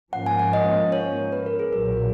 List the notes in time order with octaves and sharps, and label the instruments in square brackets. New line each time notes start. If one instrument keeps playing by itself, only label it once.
[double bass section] G#2 F3 A#3 C#4 [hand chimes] F#5
[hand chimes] G#5
F#5
D#5
C#5
B4
A#4
G#4
[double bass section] B1 A#2 F#3 [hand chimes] A#4
[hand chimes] C#5